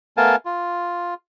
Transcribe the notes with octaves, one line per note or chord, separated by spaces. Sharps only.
A3 B3 A#4 F5 G#5 A5
F4